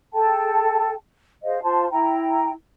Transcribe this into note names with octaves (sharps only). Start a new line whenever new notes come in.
G#4 A4 G5 A5
G#4 C5 D#5 F5
F4 C5 A5 C6
E4 G5 A#5